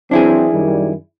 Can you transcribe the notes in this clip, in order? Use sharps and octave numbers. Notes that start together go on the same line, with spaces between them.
E3 F#3 C4 D4 E4 G#4
F#2 D#3 G3